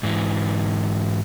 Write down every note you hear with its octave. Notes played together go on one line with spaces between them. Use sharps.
G#2 E3